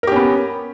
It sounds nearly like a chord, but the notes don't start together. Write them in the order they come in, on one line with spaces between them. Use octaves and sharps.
A#4 G4 C#4 B3